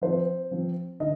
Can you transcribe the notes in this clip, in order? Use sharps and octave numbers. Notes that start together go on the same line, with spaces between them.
F3 C4 C5
F3 C4
D3 D#5